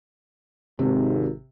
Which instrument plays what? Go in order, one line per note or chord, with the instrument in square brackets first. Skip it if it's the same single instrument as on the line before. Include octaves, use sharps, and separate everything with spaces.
[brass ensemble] G#1 [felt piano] C3